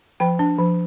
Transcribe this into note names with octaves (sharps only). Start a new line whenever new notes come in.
F3 G5
D4
F3